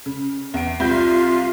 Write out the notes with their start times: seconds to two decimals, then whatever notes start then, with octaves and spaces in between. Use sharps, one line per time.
0.06 C#3
0.54 E2 D7
0.80 C2 F4 G6